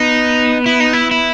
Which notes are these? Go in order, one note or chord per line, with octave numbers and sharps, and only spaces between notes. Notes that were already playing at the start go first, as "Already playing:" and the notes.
Already playing: B3 D#4
E4
D#4
E4
E4